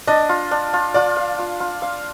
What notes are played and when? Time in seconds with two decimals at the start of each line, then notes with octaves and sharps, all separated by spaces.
0.07 D4 D#5
0.29 F4
0.51 D4
0.73 F4
0.94 F4 D5
1.17 F5
1.39 F4
1.60 F4
1.82 F5